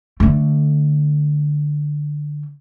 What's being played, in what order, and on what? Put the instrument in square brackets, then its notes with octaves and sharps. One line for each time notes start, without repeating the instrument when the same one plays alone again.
[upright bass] D3 A3